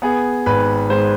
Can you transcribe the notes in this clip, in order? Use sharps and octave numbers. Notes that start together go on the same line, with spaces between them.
B3 G#4
G#1 B4
G#2 C5